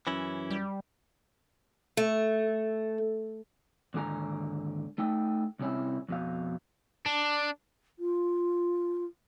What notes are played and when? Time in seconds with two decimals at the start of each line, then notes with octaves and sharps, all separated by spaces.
0.07 F#2 E3 C#4 E4
0.50 G3
1.97 A3
3.94 D#2 G#2 D3 G4 G#5 A#5
4.98 A3 D#4 G5
5.59 C2 C3 C#4 E4
6.09 F2 B2 F5
7.06 D4
7.99 F4